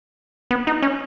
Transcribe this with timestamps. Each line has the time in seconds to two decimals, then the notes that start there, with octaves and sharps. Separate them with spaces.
0.51 B3
0.67 D#4
0.82 C#4